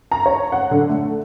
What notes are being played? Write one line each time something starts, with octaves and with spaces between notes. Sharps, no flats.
A#5
C#5
F#5
D3
A3